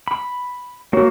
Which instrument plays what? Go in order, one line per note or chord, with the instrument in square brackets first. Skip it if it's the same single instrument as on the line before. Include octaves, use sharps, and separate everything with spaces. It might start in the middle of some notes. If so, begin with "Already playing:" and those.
[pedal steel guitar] B5
[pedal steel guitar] A#3 F#4 [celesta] C#5